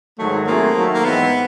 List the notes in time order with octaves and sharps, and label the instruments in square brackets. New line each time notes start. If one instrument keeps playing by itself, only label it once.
[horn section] G#2 D#3 F#3 [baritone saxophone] A3
[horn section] F#3 A3 C4 F4 G#4 [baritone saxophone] A#3
[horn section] D#3 F#3 A3
[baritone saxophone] A#3
[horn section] G#2 E3 G#3 C4 D#4 [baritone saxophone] B3